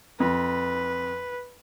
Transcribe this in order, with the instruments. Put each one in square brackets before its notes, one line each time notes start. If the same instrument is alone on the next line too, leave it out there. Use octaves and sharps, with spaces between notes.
[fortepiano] F2 [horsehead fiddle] B4